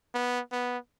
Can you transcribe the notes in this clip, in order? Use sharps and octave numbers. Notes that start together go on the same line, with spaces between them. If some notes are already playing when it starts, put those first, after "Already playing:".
B3
B3